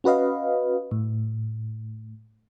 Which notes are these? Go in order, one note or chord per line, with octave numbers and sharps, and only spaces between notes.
C#4 F#4 B4 D#5 F5
A2